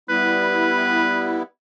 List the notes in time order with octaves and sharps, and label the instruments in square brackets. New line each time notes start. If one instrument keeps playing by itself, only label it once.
[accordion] G3 B3 E4 [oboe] B4